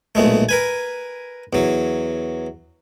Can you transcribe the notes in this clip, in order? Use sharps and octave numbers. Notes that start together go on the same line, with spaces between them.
B1 A#2 G#3 A3
A#4 B4 G#5
E2 F#3